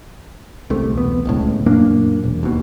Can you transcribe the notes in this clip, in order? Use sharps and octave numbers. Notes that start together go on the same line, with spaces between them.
C2 C3 A3
E1 B3
D1 C#2 A2
F#2 A#2 A#3 D4
E1
D#2 B2